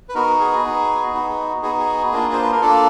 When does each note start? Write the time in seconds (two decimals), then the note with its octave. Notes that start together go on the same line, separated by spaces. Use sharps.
0.09 B4
0.15 B3 D#4 F#4 A#4
0.40 G#4
0.64 B3 D#4 F#4
1.13 B3 D#4 F#4
1.63 B3 D#4 F#4 G#4
1.79 G#4
2.12 A#3 D4 F4
2.33 C5
2.42 B4
2.52 A#4
2.61 A#3 D4 F4 A4